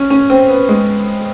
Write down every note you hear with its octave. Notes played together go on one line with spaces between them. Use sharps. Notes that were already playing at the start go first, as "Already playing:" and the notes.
Already playing: C#4
C#4
C4
B3
G#3